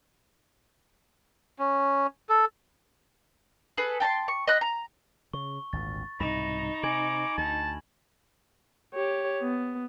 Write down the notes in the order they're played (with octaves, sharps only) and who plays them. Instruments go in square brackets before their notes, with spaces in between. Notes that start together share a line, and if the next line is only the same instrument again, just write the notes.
[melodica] C#4
A4
[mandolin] G#4 A4 B4
G5 A5 A#5 C6
C#6
D#5 B5 F#6
A#5
[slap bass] C#3 [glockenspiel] C#6
[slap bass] G#1 D2 A#2 [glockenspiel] A6
[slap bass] C2 G#2 B2 [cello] D#4 [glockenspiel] B5 A#6 E7
[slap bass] C3 [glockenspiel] G#5 G#6 F#7 [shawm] D6
[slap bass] D2 [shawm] A5
[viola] G4 C#5
B3